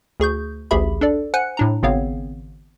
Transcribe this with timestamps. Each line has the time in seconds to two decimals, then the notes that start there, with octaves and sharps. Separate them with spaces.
0.20 D2 G#4 C#6 G6
0.71 A1 D2 G4 G#4 E5 B5
1.01 D4 A4 D5
1.34 C5 F#5 G#5 F#6 C#7
1.57 A2 D4 A#5
1.83 G#1 C#3 B3 C4 C#5 F5